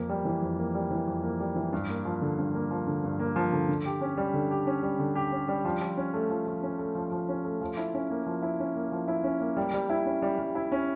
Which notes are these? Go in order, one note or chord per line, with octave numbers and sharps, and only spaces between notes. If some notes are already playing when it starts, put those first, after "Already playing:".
Already playing: F2 A#3
G3
E3
F2
A#3
G3
E3
F2
A#3
G3
E3
G2
A#3
F3
D3
G2
A#3
F3
D3
G2
A#3
F3
D3
D3
G4
C#4
G3
D3
G4
C#4
G3
D3
G4
C#4
G3
F3
F3
C#4
A3
F3
F3
C#4
A3
F3
F3
C#4
A3
F3
E4
C#4
A#3
F3
E4
C#4
A#3
F3
E4
C#4
A#3
G3
G3
E4
C#4
G3
G3
E4
C#4